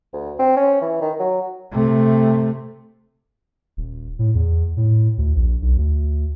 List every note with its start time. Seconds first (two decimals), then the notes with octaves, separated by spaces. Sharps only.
0.13 D2
0.39 C4
0.57 C#4
0.82 E3
1.02 D#3
1.19 F#3
1.72 C3 A3
3.77 D#1
4.19 A2
4.35 E2
4.77 A2
5.18 D2
5.36 A#1
5.62 B1
5.77 D2